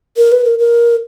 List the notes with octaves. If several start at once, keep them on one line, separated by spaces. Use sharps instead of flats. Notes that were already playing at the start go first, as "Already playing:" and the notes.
A#4
B4
A#4
A#4